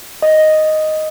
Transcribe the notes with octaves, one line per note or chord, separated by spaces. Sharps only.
D#5